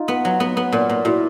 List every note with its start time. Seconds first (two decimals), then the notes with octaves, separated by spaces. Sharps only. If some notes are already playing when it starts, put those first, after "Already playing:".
Already playing: D#4 F4
0.08 B3
0.25 F#3
0.40 B3
0.57 B3
0.72 A#2
0.89 A#2
1.04 A#2 E4 F#4